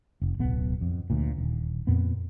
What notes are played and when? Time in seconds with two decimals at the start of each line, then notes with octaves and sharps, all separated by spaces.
0.22 F1
0.39 D1 B1 B2 B3
0.81 F2
1.10 D2 A#2
1.38 D#1
1.87 F2 A#2 B3